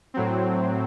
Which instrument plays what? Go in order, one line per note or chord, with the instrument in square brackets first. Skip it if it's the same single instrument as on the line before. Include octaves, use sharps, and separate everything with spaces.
[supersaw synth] A2 F#3 C4